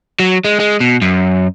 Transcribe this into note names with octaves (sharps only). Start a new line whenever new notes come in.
F#3
G#3
G#3
B2
F#2